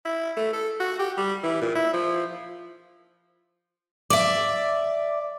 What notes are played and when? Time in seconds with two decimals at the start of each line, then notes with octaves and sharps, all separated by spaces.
0.05 E4
0.37 A3
0.53 A4
0.80 F#4
0.99 G4
1.17 G3
1.43 E3
1.61 A#2
1.75 E4
1.93 F3
4.10 D5 E5 D6